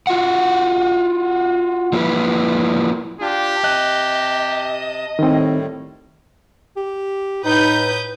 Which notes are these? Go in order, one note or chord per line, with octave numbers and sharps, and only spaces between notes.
F4 F#4 F#5
F3 A#3 C4 E4 B4
D4 F4 G4
C3 D#5 A5 F#6
A2 D#3 G3 C4
G4
A2 D#4 B4 D#6 G6